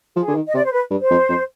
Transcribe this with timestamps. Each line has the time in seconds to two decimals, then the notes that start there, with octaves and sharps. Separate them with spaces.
0.16 F3 G#4
0.28 D3
0.35 D#3
0.47 D#5
0.54 C3 D5
0.64 C5
0.72 B4
0.91 G2
1.00 C5
1.10 F2
1.29 F2